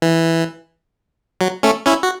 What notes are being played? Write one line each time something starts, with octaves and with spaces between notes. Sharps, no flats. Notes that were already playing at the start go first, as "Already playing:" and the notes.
E3
F#3
A3 C#4
C#4 E4
F#4